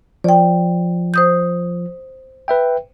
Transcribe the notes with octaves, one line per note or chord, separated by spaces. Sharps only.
F3 D5 G5
C5 D#6 G6
B4 E5 G5